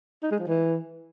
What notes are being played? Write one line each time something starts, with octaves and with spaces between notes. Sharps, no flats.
D#4
G#3
F3
E3